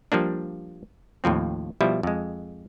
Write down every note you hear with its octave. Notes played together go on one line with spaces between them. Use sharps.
F3 G3 A#3 D4
D#2 A2 F3 C4
B2 F3 G3 E4 E5
F2 G#3